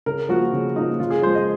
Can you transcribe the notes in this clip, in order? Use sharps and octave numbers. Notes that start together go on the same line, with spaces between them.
C#3 A#4
F3 A#3 F#4
C#3
F3 A#3 D#4
C#3 F4
G#4
F3 G#3 C5
D#5